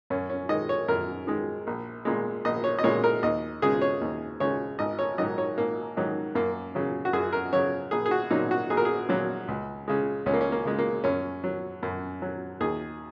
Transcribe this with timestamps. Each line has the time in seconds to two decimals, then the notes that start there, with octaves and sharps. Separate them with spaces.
0.10 F#2 C#4
0.29 C#4
0.49 D#3 G#3 D#5
0.69 C#5
0.88 F#2 A#4
1.27 D#3 G#3
1.67 A#1
2.05 A#2 G#3
2.45 A#1 D#5
2.64 C#5
2.79 D#5
2.84 A#2 G#3 C#5
3.04 A#4
3.23 D#2 D#5
3.62 C#3 G#3 G#4
3.82 C#5
4.01 D#2
4.40 C#3 G#3 C#5
4.79 G#1 D#5
4.99 C#5
5.18 G#2 D#3 F#3 D#5
5.38 C#5
5.58 G#1 A#3
5.97 G#2 D#3 F#3
6.35 F#2 A#3
6.75 C#3 F#3
7.05 F#4
7.13 F#2 G#4
7.33 A#4
7.53 C#3 F#3 C#5
7.91 A#1 G#4
8.06 G#4
8.11 F#4
8.31 A#2 F#3 D#4
8.51 F#4
8.70 A#1 G#4
8.77 A#4
8.85 G#4
9.09 A#2 F#3
9.48 C#2
9.88 C#3 G#3
10.26 C#2 C#4
10.33 A#3
10.41 C#4
10.52 A#3
10.65 C#3 G#3
10.78 A#3
11.04 F#2 C#4
11.44 F#3
11.83 F#2
12.22 F#3
12.60 D#2 G#4